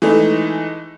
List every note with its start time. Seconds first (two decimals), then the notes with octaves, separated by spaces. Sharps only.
0.02 E3 G#3 A3 D#4